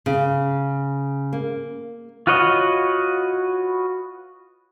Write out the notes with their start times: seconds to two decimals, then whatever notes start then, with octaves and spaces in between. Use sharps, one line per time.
0.06 C#3
1.33 A#3
2.27 F4 F#4 B4 C#5 D#5